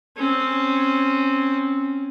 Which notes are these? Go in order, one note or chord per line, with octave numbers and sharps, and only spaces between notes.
C4 C#4